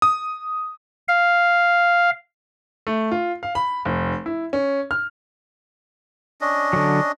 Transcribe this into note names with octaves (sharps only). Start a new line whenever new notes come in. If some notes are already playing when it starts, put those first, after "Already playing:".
D#6
F5
A3
F4
F5
B5
F1
E4
C#4
F6
C#4 D4 D#5
D3 F#3